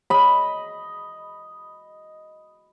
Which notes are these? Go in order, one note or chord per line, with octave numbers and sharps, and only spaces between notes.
D#5 B5